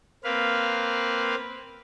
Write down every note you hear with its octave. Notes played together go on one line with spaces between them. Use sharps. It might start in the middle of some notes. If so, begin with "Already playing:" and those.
A#3 C4 B4 F5